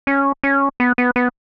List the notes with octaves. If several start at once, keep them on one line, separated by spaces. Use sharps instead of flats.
C#4
C#4
B3
B3
B3